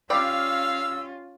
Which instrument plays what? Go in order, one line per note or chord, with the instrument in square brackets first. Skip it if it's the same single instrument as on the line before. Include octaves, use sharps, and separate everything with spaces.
[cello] C#4 F4 [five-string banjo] G4 D5 B5 [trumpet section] F5 [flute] E6